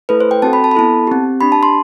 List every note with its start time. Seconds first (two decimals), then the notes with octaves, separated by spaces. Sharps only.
0.09 A3 E4 A4 B4
0.20 C5
0.31 G5
0.42 C4 F#4 A4 A5
0.53 B5
0.64 A5
0.71 B5
0.75 B3 E4 A4 A5
1.07 C4 G4
1.41 D4 G4 B5
1.52 A5
1.63 C6